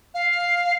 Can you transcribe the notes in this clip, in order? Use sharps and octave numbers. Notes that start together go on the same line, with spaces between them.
F5